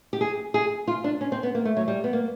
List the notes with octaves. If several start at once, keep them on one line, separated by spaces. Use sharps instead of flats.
G4
G#4
G#4
F4
D4
C#4
C4
B3
A#3
A3
F#3
G3
B3
A#3